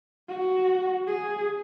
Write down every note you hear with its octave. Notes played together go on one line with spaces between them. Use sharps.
F#4
G#4